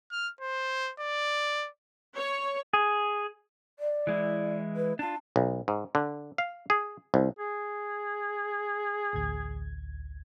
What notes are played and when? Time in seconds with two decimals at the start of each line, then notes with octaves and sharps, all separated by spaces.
0.11 F6
0.41 C5
1.00 D5
2.17 C#5
2.73 G#4
3.79 D5
4.07 E3 G#3 E4
4.76 B4
4.99 D4 F4 A5
5.36 B1
5.68 G#2
5.95 D3
6.38 F5
6.70 G#4
7.14 C2
7.39 G#4
9.13 A1 D2 G#6